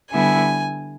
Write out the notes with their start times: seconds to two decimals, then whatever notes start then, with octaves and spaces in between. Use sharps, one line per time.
0.12 D3 G3 B3 E4 G#5